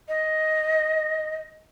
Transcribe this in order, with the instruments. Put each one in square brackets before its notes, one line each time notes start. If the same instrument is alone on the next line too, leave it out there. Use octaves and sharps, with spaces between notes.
[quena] D#5